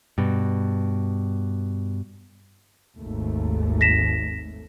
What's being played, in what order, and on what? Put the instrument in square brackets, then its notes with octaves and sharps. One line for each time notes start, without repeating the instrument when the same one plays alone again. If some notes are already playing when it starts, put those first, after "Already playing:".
[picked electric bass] G2 B2
[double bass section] G#1 D#2 A3
[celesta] A#6 B6 E7